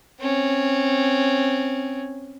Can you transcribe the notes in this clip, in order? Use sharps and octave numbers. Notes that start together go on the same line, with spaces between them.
C4 C#4